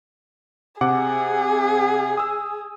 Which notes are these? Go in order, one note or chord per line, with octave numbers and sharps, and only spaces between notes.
C3 G#4 F#5 D6
D#6 E6